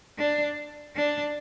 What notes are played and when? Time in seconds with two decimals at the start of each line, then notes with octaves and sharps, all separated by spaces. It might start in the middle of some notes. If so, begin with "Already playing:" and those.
0.18 D4
0.96 D4